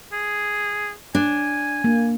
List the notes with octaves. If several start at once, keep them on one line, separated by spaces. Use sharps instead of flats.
G#4
D4 G#5
A#3